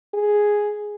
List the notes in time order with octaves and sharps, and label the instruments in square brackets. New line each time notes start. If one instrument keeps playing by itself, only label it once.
[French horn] G#4